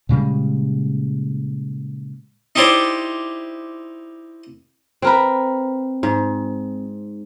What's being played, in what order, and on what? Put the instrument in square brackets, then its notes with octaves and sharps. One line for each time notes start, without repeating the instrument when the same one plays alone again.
[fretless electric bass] A#2 C#3 G3 G#3
[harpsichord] D#4 E4 G4 C5 D5
[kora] C4 A#4 B4
G#2